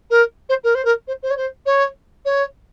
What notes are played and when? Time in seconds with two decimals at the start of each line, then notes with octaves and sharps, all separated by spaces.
0.10 A#4
0.49 C5
0.63 A#4
0.74 C5
0.84 A#4
1.07 C5
1.22 C5
1.30 C#5
1.37 C5
1.65 C#5
2.25 C#5